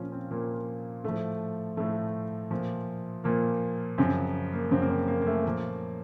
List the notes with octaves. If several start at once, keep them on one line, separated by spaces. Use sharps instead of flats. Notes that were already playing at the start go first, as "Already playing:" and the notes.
Already playing: A#2 F3 C#4 F4
C4
A#2 F3 A#3
A2 F3 A3
A2 F3 A3
A#2 F3
A#2 F3 A#3
F#2 C#3 F3 C4
A#3
F#2 C#3 F3 C4
A#3
C4
A#3
A#3
A3
A#2 F3 A#3